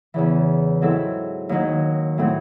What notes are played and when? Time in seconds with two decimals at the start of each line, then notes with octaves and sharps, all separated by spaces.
0.14 E2 C#3 E3
0.81 G#2 F#3 C4 E4 A4
1.49 D#2 D#3 F#3
2.18 A2 F#3 C4